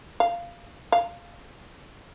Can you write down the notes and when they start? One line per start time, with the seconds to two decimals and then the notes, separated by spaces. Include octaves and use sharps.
0.20 F5
0.92 F5